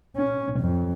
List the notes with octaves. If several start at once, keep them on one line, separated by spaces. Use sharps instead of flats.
C#4
F2